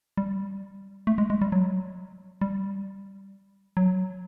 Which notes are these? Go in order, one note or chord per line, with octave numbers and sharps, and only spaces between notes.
G3
A3
G#3
G#3
G3
F#3
G3
F#3